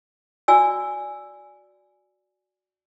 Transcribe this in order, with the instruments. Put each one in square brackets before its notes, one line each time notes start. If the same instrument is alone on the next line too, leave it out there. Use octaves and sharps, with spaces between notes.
[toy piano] F#4 D5 G#5 E6